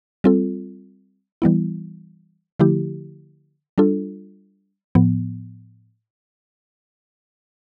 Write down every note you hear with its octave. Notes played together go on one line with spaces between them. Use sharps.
G3 C4 F4 A4
E3 G3 B3 E4
D3 F3 A3 E4 G4
G3 D4 F4 A4
A2 F3 B3